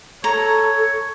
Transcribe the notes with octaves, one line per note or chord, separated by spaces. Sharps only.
A4 C#5 A#5